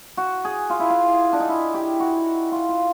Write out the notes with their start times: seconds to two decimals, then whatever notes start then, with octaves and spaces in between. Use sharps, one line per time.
0.17 F#4
0.45 G#4
0.70 F4
0.79 E4
0.90 F4
1.33 D4
1.40 D#4
1.49 E4
1.74 G4
2.00 F#4
2.52 F4
2.69 F4